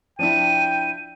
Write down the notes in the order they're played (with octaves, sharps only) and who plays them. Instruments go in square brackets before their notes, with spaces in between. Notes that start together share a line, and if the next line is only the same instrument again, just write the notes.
[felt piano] F3 D4 E4 [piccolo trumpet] G5 [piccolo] D#7